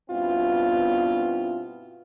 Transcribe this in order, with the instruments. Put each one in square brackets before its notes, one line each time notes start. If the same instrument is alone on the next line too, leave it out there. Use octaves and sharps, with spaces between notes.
[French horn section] G2 B2 B3 C4 E4 F4